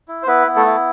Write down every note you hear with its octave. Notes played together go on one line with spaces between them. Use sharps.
E4
C5
B3 E4 B4
B3
A3 A4
E4